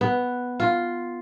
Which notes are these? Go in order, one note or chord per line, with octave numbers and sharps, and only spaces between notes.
B3
F4